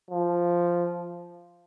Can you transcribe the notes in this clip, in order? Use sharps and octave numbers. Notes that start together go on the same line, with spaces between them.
F3